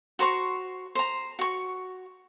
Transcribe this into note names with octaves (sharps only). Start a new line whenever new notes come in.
F#4 C5 A#5 C#6
C5 A#5
F#4 C#6